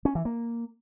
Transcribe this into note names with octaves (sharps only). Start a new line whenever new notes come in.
C#4
E3
A#3